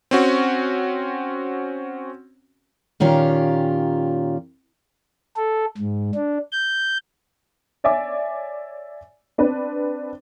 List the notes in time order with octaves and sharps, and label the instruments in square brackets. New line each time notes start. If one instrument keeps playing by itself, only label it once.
[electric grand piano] C4 C#4 F#4
[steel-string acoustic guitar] A#2 D#3 C#4 F4 G4
[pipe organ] A4
G#2
D4
G6
[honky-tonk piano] C#5 D5 E5 G#5 D6
C4 D4 B4